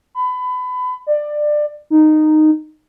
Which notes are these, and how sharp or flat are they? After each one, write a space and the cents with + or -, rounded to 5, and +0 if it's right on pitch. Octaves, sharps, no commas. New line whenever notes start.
B5 +25
D5 +20
D#4 -10